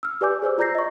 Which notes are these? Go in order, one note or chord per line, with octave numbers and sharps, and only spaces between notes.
E6 F6
G4 B4 D5 G#5 D6 G6
G#4 C5 D5 E6
F4 D5 A#5 G6 A#6 C7
D#5 C#6